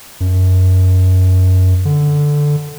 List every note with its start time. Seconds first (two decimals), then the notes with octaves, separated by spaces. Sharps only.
0.20 F#2
1.85 D3